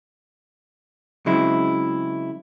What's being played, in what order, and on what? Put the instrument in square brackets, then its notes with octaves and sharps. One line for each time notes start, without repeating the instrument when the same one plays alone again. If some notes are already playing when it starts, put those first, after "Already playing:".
[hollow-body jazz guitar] C#3 F#3 G#3 C4 E4